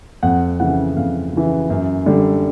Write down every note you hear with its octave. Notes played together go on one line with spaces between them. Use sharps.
F2 F#5
C#3 E3 F#5
F2 F5
C#3 E3
F#2
D3 G3